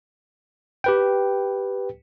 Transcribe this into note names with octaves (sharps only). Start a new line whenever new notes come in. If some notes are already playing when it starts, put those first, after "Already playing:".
G4 B4 G5